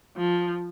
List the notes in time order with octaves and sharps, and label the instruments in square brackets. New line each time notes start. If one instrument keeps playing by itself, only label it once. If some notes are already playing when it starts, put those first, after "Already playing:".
[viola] F3